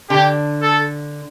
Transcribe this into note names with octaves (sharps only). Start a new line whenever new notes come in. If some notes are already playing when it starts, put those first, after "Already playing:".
D3 G4
A4